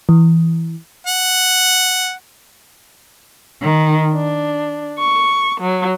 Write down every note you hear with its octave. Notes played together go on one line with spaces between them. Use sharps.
E3
F#5
D#3
D4
C#6
F#3